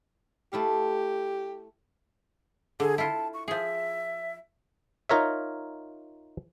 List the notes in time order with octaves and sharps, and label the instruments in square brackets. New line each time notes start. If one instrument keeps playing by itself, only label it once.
[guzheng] A3 E4 F5 [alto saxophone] G4
[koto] D3 [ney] G#4
[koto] E4 F4 [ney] A5
[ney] C#6
[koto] F3 G#4 [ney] E5
[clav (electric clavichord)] D#4 F4 A#4 C#5 E5